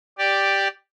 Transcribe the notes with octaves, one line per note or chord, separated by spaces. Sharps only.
G4 D5